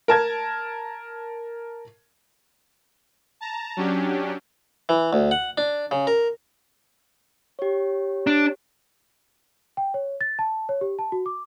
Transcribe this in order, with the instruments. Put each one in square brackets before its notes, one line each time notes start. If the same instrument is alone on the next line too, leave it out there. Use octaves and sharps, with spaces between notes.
[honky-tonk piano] A#4 A5 G#6
[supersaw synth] A5 A#5
F#3 C#4 D4 G4
[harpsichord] E3
D2
F#5
D4
C#3
A#4
[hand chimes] G4 C#5
[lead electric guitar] D4
[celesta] G5
C#5
A6
A5
C#5
G4
A5
F#4
D6